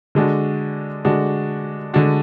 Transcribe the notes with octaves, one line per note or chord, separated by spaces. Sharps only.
D3 G#3 D4 F#4
D3 G#3 D4 F#4
D3 G#3 D4 F#4